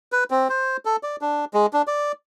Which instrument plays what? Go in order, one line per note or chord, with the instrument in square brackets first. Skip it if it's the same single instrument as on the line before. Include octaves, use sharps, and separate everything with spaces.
[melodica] B4
C4
C5
A4
D5
D4
G#3
D4
D5